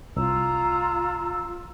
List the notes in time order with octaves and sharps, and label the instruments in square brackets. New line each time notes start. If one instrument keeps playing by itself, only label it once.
[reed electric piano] C2 [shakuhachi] F4 [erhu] A#5 [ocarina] E6